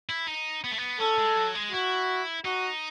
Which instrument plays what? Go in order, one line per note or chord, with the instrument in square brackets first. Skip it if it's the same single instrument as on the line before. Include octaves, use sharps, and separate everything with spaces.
[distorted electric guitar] E4
D#4
B3
A3
B3
[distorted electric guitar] C#4 [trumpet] A4
[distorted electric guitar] G#3
F#3
G#3
[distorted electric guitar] E4 [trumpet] F#4
[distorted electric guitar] D#4 [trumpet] F#4